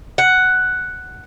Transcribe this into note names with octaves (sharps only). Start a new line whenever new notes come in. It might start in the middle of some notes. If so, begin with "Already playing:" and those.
F#5